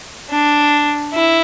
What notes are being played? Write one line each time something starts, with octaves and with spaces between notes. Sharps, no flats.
D4
E4